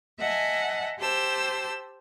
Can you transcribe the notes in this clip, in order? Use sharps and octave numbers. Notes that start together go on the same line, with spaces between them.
D#5 E5 F#5 G#5 A5
G4 C5 A5 E6